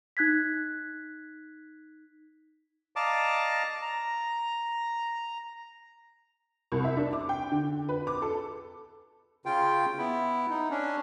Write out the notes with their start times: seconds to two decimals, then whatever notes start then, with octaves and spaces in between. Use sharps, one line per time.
0.17 D#4 F#6 G#6 B6
2.96 D5 D#5 F5 A5 A#5 D6
3.82 A#5
6.72 C2
6.84 E5
6.97 D4
7.13 D6
7.29 G5
7.52 D3
7.89 B4
8.07 D6
8.22 A4
9.46 C#3 F4 G5
9.98 B3 E4
10.50 D#4
10.70 C#4 D4